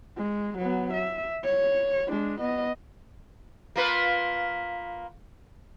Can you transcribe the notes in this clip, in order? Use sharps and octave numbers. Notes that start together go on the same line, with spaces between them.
G#3
F#3 B3
E5
C#5
G#3 D4
B3 D#5
A#3 F4 B4